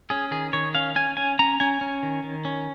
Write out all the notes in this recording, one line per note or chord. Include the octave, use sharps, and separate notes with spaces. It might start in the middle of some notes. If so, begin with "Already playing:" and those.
C#4 G#4
D#3 G#4
D#3 C#5
C#4 F5
C#4 G#5
C#4 G#5
C#4 A#5
C#4 G#5
C#4
D#3
D#3
C#4